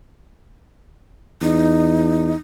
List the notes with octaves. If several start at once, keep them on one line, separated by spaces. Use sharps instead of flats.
E2 D#4